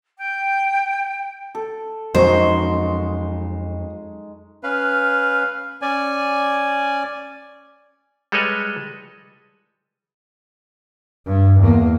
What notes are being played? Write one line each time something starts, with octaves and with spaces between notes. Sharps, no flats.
G5
A4
F2 F#3 G#3 D#4 C5 C#6
C#4 B4 F5
C#4 D5 G#5
G3 G#3 A4 B4 C#5 D#5
G2
E2 A#3